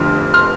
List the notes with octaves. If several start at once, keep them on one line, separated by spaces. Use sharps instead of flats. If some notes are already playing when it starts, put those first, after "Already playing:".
Already playing: F1 F2 D3 C6 F6
C6 F6